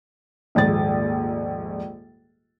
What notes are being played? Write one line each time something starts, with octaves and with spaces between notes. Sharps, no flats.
D#1 A#1 G#2 A6